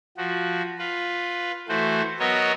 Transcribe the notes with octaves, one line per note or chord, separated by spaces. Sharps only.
F3 F#4
F4 B4
E3 A3 F#4 C5
F#3 B3 F#4 A#4 C#5 D#5